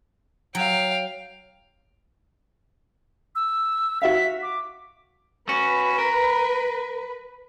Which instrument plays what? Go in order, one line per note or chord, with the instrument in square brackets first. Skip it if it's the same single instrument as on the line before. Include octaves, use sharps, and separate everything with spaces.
[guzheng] F#3 [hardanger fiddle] F5 G5
[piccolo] E6
[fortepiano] F#4 E5 F5 [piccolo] B6
[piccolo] D6
[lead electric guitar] C#4 F#4 [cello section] B4
[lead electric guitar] A#4